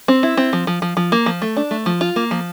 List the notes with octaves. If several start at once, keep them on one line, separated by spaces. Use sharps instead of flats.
C4
E4
C4
F3
F3
F3
F3
A#3
F3
A3
D4
A3
F3
F4
A#3
F3